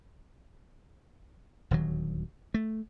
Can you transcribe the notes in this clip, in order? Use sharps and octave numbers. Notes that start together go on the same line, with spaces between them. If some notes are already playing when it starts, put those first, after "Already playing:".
D#1 D2 D#3 F#3
A3